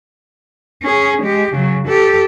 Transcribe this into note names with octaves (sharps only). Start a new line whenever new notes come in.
C#4 G#4
G#3 G4
C#3 F#3
G4 A4